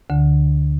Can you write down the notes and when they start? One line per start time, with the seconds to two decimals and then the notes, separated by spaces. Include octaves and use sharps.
0.10 D2 D3